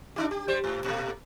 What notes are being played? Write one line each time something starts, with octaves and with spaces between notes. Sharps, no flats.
D4 D#4 G4
G4
G3 C5
G#2
A#2 A3